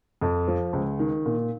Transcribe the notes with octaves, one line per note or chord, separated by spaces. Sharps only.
F2
F3
C#2
D#3
A#2